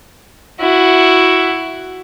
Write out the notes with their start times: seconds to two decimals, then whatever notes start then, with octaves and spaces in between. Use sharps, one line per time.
0.60 E4 F#4